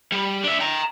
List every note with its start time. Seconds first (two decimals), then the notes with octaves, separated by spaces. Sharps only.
0.12 G3
0.44 D4 E5
0.60 G5 A#5